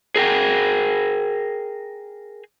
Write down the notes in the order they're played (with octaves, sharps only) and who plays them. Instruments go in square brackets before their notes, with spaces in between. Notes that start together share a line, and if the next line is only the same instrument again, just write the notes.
[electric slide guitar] G#4 A#4 G5